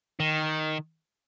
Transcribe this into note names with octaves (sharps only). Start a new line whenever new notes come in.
D#3